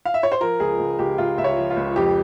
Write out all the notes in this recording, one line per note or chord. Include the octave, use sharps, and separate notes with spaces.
F5
E5
C#5
C5
F3 A#4
C#2 G#4
C#2
C#2 G4
C#2 F4
C#2 E5
C#5
F3
F4
C#2
F2 G4